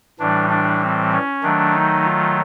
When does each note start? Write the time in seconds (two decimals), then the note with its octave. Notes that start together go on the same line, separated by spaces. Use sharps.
0.19 A2 E3 G3 D4
0.50 D4
0.81 C4
1.12 C#4
1.42 D#3 F#3 A3 D4
1.73 D#4
2.04 F4